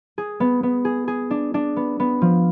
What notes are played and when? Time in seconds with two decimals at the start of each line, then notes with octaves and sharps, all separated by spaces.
0.18 G#4
0.40 B3
0.63 B3
0.85 G#4
1.08 G#4
1.31 D4
1.54 D4
1.76 B3
2.00 B3
2.22 F3